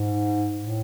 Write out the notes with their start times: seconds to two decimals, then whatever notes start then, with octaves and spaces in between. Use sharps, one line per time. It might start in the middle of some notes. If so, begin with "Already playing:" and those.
Already playing: G#2
0.60 A2